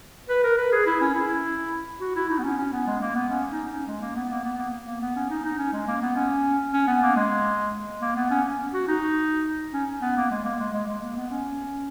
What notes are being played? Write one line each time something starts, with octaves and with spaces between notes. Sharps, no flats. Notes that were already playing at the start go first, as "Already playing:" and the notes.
B4
A#4
B4
G#4
E4
C#4
E4
F#4
E4
D#4
B3
C#4
C#4
B3
G#3
A#3
B3
C#4
D#4
C#4
G#3
A#3
B3
A#3
B3
A#3
A#3
B3
C#4
D#4
D#4
C#4
G#3
A#3
B3
C#4
C#4
B3
A#3
G#3
A#3
B3
C#4
F#4
D#4
C#4
B3
A#3
G#3
A#3
G#3
G#3
G#3
A#3
B3
C#4